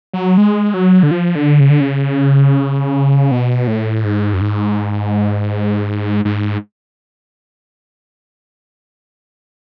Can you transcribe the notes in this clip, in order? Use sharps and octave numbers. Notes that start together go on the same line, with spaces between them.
F#3
G#3
F#3
D3
F3
D3
C#3
D3
C#3
B2
A2
G#2
F#2
G#2
G#2